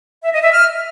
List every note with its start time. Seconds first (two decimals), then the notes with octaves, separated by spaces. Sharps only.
0.23 E5
0.33 D#5
0.43 E5
0.52 F6